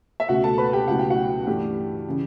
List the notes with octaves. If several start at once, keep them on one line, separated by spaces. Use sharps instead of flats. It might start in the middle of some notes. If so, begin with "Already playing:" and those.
E5
C#2 B2 A3 F#4 F#5
A4 A5
B4 B5
G4 G5
C#2 B2 F#3 A3 E4 F#5
G5
F#4 F#5
G2 E3 A3 D4 G4
C#3 E3